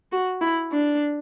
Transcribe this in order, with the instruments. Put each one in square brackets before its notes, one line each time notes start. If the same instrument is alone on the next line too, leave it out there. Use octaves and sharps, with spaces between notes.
[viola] F#4
E4
D4